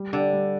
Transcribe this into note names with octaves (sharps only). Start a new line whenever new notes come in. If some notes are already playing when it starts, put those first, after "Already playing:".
Already playing: G3
D3 D4 G4
G3